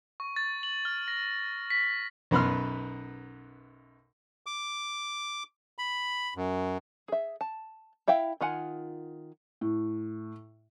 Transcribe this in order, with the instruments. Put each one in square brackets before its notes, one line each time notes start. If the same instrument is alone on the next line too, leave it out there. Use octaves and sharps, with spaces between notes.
[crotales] C#6
A6
F#7
F6
A#6
B6
[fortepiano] B1 F#2 B3 B4 C6 F6
[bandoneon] D6
B5
F#2
[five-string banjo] G#4 E5
A5
E4 E5 F5 G5
D#3 F4 F#5 G#5
[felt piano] A2